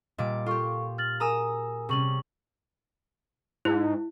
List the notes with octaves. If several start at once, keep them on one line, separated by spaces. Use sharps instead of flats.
A#2 G3 D#5 D6
F4 G4 A4 C#6
F6 A6 F#7
G#4 A#4 G#5 A#5 D#6 E6
C3 G3 C#4 G#4 C#6 F#7
G#2 E4